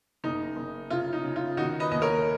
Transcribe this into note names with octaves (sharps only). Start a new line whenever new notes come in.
F#1 D#4
F#1
C#3 F4
D#4
C#3
F4
D#3 D#4 F#4
B4 D#5
D#2 D#5
A#4 C#5